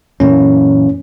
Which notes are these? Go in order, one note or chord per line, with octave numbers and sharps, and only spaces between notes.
F#2 A#2 E3 C#4